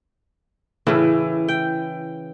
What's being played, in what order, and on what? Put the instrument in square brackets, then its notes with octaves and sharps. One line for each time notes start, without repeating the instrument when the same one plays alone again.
[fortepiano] A2 [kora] C#3 E3
[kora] G5